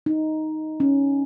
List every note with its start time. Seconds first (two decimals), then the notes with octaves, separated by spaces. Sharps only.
0.06 D#4
0.80 C#4